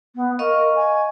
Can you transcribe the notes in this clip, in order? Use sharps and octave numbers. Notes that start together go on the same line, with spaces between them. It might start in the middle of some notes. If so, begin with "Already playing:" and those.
B3
A#4 D#5 F5 C#6
G#5